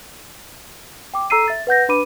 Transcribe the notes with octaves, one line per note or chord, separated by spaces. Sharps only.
G5 D6
A4 A#5 E6 C7 D#7
E5 A6
B4 F#5 G6 A#6
D4 B4 B5 D6 D#7